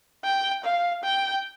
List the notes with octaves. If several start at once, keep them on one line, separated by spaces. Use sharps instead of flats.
G5
F5
G5